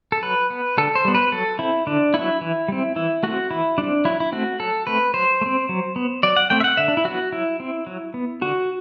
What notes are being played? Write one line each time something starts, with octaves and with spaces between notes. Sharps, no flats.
A4
F#3 B4
B3
D3 A4
C5
G3 B3
B4
F#3 A4
C4 E4
D3 D4
F#3 B3 E4
E3
G3 C4
E3 E4
A3 C4 F#4
E3 E4
G3 C4 D4
F#3 E4
E4
A3 C4 F#4
F#3 A4
A3 C4 B4
F#3 C5
A3
C4
F#3
B3
F#3 D5
F#5
A3 C4 G5
E5
F#5
D3 E5
D4
E4
F#3 B3 F#4
F#3 E4
C4
F#3
B3
D3 F#4